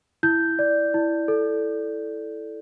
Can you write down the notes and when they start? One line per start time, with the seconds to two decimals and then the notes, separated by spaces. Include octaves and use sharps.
0.23 E4 G6
0.59 D5
0.94 E4
1.28 A4